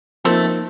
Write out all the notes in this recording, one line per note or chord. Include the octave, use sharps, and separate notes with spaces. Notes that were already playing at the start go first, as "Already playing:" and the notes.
F3 A3 A#3 C4 D#4